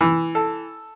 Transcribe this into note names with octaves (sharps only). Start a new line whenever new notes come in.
E3
A4